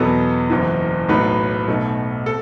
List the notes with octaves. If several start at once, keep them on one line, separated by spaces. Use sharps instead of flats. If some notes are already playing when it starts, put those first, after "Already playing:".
Already playing: E2 B2 F#3 B3 A4
F#1 F#2 E3
B1 A2 F#3 A3 B4
B1 B2 A3
A4